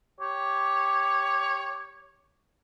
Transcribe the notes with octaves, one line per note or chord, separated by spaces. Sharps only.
G4 C#5